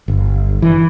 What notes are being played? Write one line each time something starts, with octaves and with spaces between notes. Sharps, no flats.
G1
E3